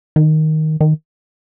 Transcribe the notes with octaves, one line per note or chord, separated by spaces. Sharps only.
D#3
D#3